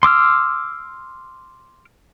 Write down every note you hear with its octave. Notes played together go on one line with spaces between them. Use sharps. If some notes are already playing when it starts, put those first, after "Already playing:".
C6 D6 E6 F6